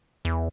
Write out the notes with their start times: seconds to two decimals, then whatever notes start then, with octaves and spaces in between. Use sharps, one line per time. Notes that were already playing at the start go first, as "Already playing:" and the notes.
0.25 E2